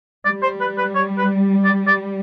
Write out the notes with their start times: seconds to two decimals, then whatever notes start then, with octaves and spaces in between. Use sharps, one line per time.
0.25 G3 D5
0.42 C5
0.61 B4
0.78 B4
0.95 C#5
1.18 B4
1.64 D5
1.87 D5